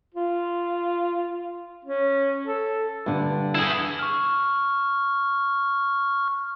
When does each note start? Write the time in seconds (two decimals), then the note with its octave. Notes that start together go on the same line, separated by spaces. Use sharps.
0.14 F4
1.85 C#4
2.47 A4
3.06 G2 D3
3.55 E4 G#4
3.99 C#6 F6